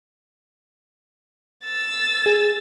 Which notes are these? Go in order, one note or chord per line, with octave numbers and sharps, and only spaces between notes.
E6 A6
G#4